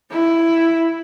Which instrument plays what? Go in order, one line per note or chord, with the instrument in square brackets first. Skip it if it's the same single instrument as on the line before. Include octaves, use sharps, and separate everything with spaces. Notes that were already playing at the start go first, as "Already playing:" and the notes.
[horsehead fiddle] E4